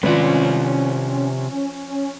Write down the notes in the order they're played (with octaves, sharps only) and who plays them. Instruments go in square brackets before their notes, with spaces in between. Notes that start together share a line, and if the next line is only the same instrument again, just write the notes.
[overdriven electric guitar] C3 D5 [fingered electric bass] D#3 G#3 [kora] F3 B4 [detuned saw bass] C#4